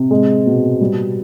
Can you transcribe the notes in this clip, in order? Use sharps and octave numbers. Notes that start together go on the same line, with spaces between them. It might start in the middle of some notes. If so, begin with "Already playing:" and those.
Already playing: C3
G#3
B2
G3